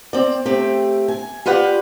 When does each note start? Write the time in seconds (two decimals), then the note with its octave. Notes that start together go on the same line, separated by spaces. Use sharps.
0.13 C4 D5
0.45 A3 C4 G4
1.08 G#5
1.46 F4 G4 B4 D5 F#5